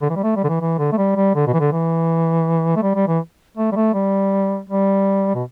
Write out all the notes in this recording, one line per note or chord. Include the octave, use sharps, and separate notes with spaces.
D3
E3
G3
A3
G3
D3
E3
E3
D3
A3
G3
G3
D3
B2
E3
D3
E3
A3
G3
G3
E3
A3
G3
A3
G3
G3
B2